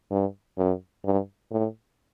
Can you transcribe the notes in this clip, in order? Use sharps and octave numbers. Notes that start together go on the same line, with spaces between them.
G2
F#2
G2
A2